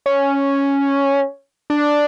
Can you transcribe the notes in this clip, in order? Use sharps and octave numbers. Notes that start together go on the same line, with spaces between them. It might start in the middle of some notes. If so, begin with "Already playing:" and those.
C#4
D4